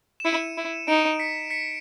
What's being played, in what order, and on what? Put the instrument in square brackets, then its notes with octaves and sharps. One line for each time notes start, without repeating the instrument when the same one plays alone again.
[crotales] E7
[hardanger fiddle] E4 [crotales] C#7 D#7
[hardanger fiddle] E4
[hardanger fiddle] D#4 [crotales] D7 E7
[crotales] B6 C#7
B6 C#7